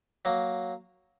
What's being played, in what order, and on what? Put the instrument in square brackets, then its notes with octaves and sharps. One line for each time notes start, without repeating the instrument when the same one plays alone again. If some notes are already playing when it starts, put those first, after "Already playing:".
[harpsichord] F#3 A#3